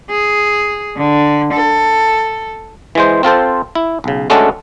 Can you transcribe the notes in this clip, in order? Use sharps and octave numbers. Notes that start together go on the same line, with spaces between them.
G#4
D3
A4
E3 G#3 C5
C4 F4 A4 C5
E4
B1 C#3
G#3 A3 C#4 D4 F#4 A4